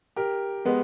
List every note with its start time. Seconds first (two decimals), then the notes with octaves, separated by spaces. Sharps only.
0.16 G4 A#4
0.65 G#3 B3